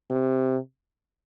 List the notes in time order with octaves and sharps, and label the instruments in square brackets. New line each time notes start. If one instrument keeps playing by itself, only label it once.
[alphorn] C3